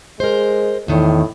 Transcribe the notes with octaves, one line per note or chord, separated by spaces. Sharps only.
G#3 A#4 C5
E2 A2 D#3